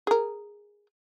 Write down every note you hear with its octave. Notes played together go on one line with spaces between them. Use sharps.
G#4 A#4